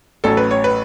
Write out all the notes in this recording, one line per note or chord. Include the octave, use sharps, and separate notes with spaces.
A1 A2 F#3 C#4 A4
B4
C#5
B4